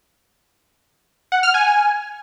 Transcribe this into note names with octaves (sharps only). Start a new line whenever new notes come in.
F#5
F6
G#5